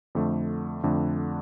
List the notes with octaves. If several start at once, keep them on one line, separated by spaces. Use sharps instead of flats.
F2 D3 A3
F2 D3 A3